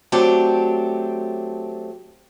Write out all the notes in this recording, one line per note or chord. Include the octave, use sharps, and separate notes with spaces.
F#3 A3 C4 D4 G4